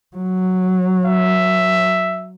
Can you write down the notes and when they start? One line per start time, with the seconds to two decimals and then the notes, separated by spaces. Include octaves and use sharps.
0.16 F#3
1.06 E5